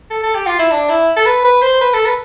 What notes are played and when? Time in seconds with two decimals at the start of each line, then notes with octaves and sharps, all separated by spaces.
0.11 A4
0.23 A4
0.35 G4
0.47 F4
0.59 E4
0.71 D4
0.89 E4
1.16 A4
1.26 B4
1.44 B4
1.62 C5
1.81 B4
1.93 A4
2.06 B4